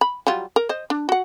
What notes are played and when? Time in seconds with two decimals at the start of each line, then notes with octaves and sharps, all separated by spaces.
0.01 B5
0.27 F#3 G3 F4
0.56 A#4
0.69 C5 D#5
0.90 D4
1.09 F#4 F#5